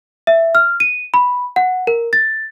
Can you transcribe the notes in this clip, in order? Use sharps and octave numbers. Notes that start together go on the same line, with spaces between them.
E5
F6
D#7
B5
F#5
A#4
A6